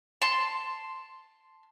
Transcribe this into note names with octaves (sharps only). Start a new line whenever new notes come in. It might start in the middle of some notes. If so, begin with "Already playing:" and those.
A5 C6